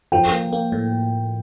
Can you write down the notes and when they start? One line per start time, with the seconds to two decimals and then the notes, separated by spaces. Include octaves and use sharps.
0.12 F3 G5
0.32 A#3
0.53 A#3
0.72 A2